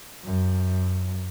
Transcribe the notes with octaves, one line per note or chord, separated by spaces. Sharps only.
F#2